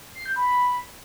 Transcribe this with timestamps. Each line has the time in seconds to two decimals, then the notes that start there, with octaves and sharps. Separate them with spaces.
0.15 C7
0.26 G6
0.36 B5